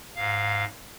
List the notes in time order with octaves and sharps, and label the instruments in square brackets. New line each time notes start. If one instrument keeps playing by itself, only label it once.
[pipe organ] G#2 F5